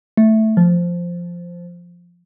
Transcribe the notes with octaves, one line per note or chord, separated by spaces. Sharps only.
A3
F3